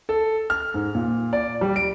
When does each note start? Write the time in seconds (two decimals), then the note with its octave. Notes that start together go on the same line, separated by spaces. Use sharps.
0.09 A4
0.50 F6
0.74 G#2
0.95 A#2
1.33 D5
1.61 G3
1.76 D7